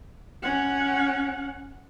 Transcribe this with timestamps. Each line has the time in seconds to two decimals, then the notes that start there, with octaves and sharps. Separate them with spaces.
0.43 C#4 F#5